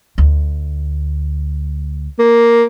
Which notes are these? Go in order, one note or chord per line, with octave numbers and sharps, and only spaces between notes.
D2
A#3